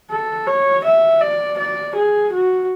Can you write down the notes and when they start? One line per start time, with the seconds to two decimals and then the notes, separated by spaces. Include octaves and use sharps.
0.10 A4
0.47 C#5
0.84 E5
1.21 D5
1.58 D5
1.95 G#4
2.32 F#4